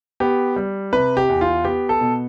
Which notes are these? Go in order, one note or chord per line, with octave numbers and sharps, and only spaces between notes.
B3 G4
G3
C3 B4
G4
E2
F4
B3 G4
A4
B2